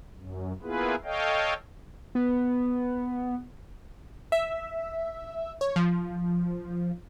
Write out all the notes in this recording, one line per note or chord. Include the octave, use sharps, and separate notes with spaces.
F#2
A#3 B3 E4 F4 G#4 B4
A4 C#5 D#5 F5 G5
B3
E5
C#5
F3